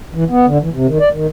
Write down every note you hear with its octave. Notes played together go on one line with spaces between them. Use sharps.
E3
B3
D3
E3
C3
D#3
D5
D#3